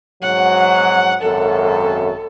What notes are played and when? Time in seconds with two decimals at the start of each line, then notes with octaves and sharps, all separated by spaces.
0.22 G#2 F#3 F#5
1.23 G#1 F#2 A4